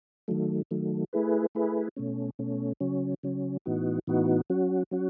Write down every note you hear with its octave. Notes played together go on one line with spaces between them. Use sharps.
D#3 F#3 A3
D#3 F#3 A3
A3 E4 G#4 B4
A3 E4 G#4 B4
B2 A3 C#4
B2 A3 C#4
C#3 F#3 C#4
C#3 F#3 C#4
A2 E3 B3 D#4 F#4
A2 E3 B3 D#4 F#4
F#3 C#4 F#4
F#3 C#4 F#4